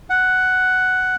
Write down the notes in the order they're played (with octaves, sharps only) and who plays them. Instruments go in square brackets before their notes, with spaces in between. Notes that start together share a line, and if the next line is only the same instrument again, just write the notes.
[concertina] F#5